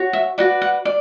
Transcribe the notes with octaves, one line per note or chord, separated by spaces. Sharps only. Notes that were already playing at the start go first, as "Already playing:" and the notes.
Already playing: F#4 C#5
E5
F#4 B4 D5 F#5
F#5
D5